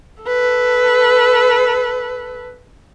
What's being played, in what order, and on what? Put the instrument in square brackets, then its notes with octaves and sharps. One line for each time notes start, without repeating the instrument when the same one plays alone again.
[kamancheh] A4 B4